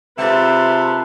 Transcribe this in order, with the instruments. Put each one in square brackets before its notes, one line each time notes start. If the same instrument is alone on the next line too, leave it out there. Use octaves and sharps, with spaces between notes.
[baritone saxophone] C3 [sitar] G#3 A4 [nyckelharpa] F4 B4 [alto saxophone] E5